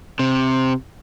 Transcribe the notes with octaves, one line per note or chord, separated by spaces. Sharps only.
C3